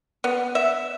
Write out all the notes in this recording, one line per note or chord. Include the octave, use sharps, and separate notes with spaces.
B3
E5